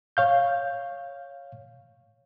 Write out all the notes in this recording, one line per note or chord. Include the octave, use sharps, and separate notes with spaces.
C#5 F5 G6